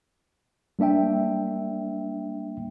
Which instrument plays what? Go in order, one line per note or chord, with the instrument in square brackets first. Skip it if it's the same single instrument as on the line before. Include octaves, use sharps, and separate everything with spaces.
[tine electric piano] G3 A#3 D4 E5 G5